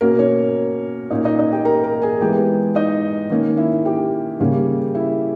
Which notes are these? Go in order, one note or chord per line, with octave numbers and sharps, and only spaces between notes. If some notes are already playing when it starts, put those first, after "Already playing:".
B2 A#3 C#4 A#4
C#4 C#5
A#2 A#3 C#4 D#4 D#5
D#4 D#5
D#4 D#5
G4 G5
A#4 A#5
A#4 A#5
G#4 G#5
E3 G#3 B3 G4 G5
D#4 D#5
D#3 A#3 C#4
E4 E5
G4 G5
C#3 G3 A#3 C#4
E4 E5